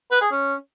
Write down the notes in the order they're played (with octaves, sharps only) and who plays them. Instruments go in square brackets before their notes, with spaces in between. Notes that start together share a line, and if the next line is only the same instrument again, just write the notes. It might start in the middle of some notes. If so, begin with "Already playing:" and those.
[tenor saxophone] B4
G#4
C#4